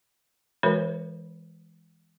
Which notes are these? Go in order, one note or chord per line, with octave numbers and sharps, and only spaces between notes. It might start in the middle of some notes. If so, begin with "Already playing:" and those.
E3 G#3 F#4 A#4 B4 C#5